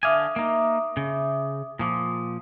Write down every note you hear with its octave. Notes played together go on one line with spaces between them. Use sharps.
D3 E5 F5 G#5 D6 D#6
A#3 D#4
C#3
A#2 F3 D6 D#6